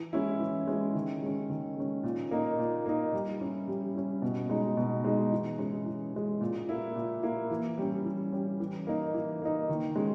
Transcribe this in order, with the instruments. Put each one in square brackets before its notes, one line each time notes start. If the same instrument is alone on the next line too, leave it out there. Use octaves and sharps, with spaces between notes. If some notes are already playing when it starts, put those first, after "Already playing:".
Already playing: [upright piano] E3
G#3 C#4 E4
E3
G#3 C#4 E4
D#3
G#3 C#4
D#3
G#3 C#4
A#2
A#3 D#4
A#2
A#3 D#4
G3
C#4 E4
G3
C#4 E4
B2
G#3 D#4
B2
G#3 D#4
E3
G#3 C#4
E3
G#3 C#4
A#2
A#3 E4
A#2
A#3 E4
E3
G3 C#4
E3
G3 C#4
E3
A#3 D#4
E3
A#3 D#4
D#3
G#3 C#4